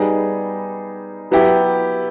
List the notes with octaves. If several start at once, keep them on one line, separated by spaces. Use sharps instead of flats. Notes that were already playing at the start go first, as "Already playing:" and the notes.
Already playing: G3 B3 D#4 G#4
F#3 B3 E4 G4